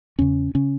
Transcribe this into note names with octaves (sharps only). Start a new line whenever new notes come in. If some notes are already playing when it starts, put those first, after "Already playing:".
E2 C#3 C#4
C#3 C#4